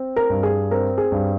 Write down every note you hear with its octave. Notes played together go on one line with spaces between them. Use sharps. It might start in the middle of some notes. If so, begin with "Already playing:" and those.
Already playing: C4
A#4
G2
G#4
C4 A#4
G#4
G2